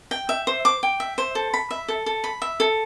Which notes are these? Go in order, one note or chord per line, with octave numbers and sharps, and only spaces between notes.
G5
E5
C5
D6
G5
E5
C5
A4
B5
E5
A4
A4
B5
E5
A4